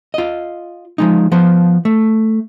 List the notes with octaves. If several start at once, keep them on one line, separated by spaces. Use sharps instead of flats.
F4 D#5
F3 G#3 D#4
F3 B3 C5
A3